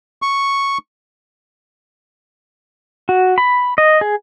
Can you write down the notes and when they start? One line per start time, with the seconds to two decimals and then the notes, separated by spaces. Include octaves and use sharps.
0.22 C#6
3.09 F#4
3.38 B5
3.78 D#5
4.01 G#4